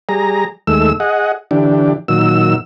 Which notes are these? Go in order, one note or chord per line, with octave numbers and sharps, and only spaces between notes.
G3 G#4 A#5
D#2 G#3 A3 E6
G#4 D#5 F#5
D3 E3 D4 G4
A#2 D#3 F#3 E6